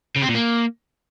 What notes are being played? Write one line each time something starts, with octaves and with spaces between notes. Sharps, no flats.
C#3
C4
A#2
A#3